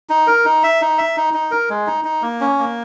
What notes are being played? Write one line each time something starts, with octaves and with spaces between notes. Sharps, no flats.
D#4
A#4
D#4
E5
D#4
E5
D#4
D#4
A#4
G#3
D#4
D#4
A#3
C#4
A#3